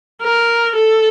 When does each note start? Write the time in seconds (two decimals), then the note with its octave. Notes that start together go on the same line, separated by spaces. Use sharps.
0.22 A#4
0.76 A4